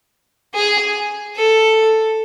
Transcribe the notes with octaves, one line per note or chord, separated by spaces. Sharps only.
G#4
A4